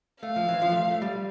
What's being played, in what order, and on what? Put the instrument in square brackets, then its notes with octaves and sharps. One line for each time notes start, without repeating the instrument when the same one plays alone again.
[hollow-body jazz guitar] A3 [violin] F5
[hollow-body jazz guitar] F3
E3
F3
A3
A3
G3